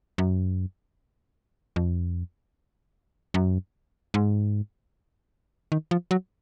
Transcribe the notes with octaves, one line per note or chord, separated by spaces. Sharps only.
F#2
F2
F#2
G#2
D#3
F3
F#3